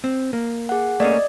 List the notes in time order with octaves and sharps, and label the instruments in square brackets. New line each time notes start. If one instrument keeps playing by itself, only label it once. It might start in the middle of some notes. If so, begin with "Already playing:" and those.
[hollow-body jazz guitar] C4
A#3
[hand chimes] G#4 F#5
[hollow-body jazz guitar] A3 A#3 C#4 [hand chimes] D5 D#5